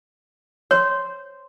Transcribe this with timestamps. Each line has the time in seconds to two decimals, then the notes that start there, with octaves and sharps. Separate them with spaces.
0.71 C5 C#5